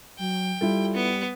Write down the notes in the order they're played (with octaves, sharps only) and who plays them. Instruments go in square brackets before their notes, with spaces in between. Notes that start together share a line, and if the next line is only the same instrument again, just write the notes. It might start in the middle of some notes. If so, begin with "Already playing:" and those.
[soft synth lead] F#3 [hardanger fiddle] G5
[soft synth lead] G3 [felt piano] E4 F4 A4
[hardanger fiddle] B3